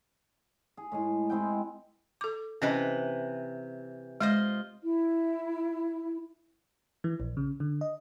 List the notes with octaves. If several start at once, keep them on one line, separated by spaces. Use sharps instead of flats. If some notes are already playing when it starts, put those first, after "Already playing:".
G#4
A2 G#3 G#4
G#3 C4 E4 G5
A4 D6
C3 E3 C#4 B4 D#5
G#3 F4 C5 D#5
E4
E3
A#1
C#3
D3
D#5